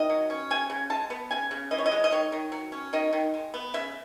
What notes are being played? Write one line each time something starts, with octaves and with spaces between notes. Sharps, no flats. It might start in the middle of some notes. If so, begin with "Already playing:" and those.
Already playing: D#3 D#5
F#3
C#4
C#3 G#5
C#3
G#3 A5
B3
C#3 G#5
C#3
E3 D#5
C#5
D#5
G#3
D#5
D#3 C#5
D#3
F#3
C#4
D#3 D#5
D#3
G#3
B3
C#3 E5